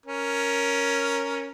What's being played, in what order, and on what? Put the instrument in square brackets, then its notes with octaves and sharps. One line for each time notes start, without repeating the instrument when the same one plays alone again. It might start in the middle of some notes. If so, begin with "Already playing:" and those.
[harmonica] C#4 A#4